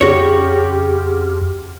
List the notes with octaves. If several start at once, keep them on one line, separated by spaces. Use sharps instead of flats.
F2 C#3 F#4 G4 C#5